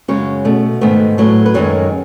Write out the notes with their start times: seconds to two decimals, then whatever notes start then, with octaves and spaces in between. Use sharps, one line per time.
0.08 F#2 C#3 G#3 C#4 C#5
0.45 B2 A3
0.81 G#2 D#3 A3 B3 B4
1.18 A2 F#3 A3
1.46 B4
1.54 F#2 D#3 G#3 C#4 C#5